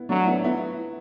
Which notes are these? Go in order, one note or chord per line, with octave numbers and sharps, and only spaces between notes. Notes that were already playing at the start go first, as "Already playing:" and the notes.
Already playing: B3 E4
F#3 A3 D4
B3 E4
B3 E4